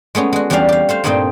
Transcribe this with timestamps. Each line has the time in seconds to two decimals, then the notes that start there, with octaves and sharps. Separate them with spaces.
0.15 G#3 A3 B3 C#4
0.33 G#3 F#4
0.50 E2 G3 C#4 D4 D5 F5
0.69 G4 F5
0.89 A3 C5 F5
1.04 G2 A#2 A3 C4 D#4 G5